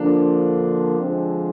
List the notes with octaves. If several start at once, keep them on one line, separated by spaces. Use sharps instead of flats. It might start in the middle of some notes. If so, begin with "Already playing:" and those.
Already playing: D3 F3 A#3 D4
D3 F3 G#3 C4